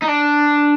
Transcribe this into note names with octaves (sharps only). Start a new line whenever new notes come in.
D#4
D4